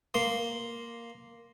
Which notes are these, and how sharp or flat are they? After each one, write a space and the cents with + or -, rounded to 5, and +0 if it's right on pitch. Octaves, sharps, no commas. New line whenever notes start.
A#3 +0 C6 +0